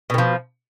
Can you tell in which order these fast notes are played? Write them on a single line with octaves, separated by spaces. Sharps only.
B2 D#3 F3